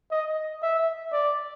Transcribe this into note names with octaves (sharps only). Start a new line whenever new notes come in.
D#5
E5
D5